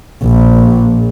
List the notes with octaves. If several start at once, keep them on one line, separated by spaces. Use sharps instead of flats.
A#1